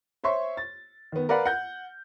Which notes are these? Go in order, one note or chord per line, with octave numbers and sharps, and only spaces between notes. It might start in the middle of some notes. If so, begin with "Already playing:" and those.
C5 C#5 E5 C6 C#6
A6
D#3 B3
A#4 B4 D5 F5 F#5 B5
F#5 G6